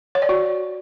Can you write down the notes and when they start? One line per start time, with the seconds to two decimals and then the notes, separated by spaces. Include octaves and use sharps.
0.15 C#5
0.22 D5
0.29 F#4